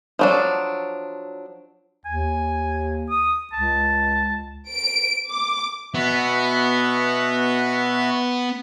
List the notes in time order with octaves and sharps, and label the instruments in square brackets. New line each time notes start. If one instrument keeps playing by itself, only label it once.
[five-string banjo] F3 F#3 D4
[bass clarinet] D#2 [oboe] G#5
[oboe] D#6
[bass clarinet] C#2 [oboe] A5
[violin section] D7
D6
[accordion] B2 F#4 E5 [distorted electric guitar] B3